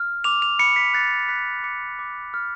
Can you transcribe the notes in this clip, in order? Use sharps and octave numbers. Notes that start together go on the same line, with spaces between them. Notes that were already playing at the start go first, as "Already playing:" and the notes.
Already playing: F6
D6 F7
F7
B5 C#7
B6
F#6 A6
F#6 B6
D6 C#7
D6
F6